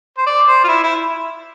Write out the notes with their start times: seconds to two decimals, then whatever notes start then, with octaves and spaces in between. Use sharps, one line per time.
0.18 C5
0.26 D5
0.47 C5
0.64 F4
0.68 E4
0.84 E4